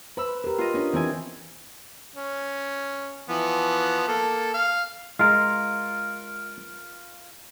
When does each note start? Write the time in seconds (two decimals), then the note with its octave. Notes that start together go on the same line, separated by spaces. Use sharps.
0.17 B4 C5 B5 E6
0.44 G4 A#4
0.58 F4 D#5
0.74 C#4 D4
0.93 E3 B3 C4 E4 G#5
2.15 C#4
3.29 E3 F3 B3
4.08 A#3 A4
4.54 F5
5.19 G#3 F4 A#4 F6